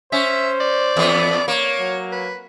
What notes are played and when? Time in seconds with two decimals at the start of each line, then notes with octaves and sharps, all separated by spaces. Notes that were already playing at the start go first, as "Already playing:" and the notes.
0.12 C#4 C5 E5
0.60 D5
0.97 E2 B3
1.48 A#3 C#5
1.80 F#3
2.12 B4